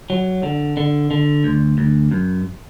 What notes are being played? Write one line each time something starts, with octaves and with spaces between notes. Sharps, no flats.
F#3
D3
D3
D3
D2
D2
F#2